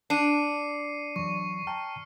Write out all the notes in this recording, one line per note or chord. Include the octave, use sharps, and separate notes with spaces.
D4 C7 C#7 D#7
E2 F#3 C#6
G5 A5 A#5 F6